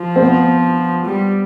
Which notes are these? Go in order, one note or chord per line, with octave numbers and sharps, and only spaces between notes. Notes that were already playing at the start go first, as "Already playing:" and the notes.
Already playing: F3
C4
B3
G3